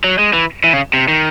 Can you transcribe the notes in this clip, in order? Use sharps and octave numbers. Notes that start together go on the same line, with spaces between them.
F#3
G#3
E3
E3
C#3
C3
D#3